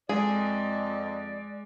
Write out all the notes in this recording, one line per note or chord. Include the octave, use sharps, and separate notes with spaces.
F2 G#3 G#4 D5 D#5